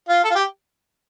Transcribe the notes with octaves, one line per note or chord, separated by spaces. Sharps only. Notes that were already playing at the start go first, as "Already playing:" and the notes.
F4
A4
F4
G4